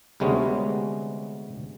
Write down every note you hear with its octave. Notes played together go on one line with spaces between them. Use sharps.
D2 C3 G3 G#3 B3 C#4